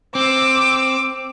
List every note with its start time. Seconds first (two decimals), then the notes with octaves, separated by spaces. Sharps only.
0.15 C4 D6 E6